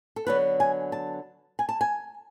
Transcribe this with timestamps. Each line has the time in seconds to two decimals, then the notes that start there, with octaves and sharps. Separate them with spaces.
0.16 A4
0.27 D3 F#3 B3 B4
0.60 G#5
0.92 A5
1.59 G#5
1.69 A5
1.81 G#5